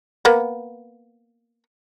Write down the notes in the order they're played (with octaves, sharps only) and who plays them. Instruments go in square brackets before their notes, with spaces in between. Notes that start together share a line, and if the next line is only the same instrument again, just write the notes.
[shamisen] A#3 B3